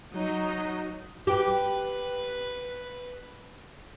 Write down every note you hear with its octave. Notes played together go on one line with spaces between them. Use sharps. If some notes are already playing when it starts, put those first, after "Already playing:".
F#3 D#4 D#5
G4 B4